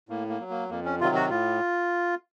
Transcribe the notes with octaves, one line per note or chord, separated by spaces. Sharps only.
A2 A#3
A#3
F#3
A#3
F2 A#3
C#4
C3 D#3 F#3 F4
F#4
A2 F4